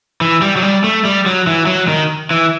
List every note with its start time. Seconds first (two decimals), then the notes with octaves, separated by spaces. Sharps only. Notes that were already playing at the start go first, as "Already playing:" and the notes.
0.21 E3
0.42 G3
0.56 F#3
0.62 G3
0.84 A3
1.05 G3
1.26 F#3
1.47 E3
1.67 F#3
1.88 D#3
2.31 E3